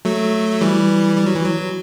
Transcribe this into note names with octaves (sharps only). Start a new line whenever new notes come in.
F#3 A3
E3 G3
G3
F#3
E3
F#3